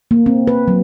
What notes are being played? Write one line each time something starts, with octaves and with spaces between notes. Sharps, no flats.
A#3
C4
B4
F#3